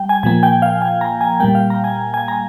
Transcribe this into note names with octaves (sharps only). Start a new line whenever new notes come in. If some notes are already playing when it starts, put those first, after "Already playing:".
Already playing: G3 G5
G#5
A#2 F3 A#3 G#5
G5
F5
G#5
A#5
G#5
A#2 G3 A#3 G5
F5
A#5
G#5
G#5
A#5